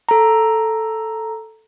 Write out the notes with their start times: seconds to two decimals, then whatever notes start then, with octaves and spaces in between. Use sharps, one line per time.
0.09 A4 A#5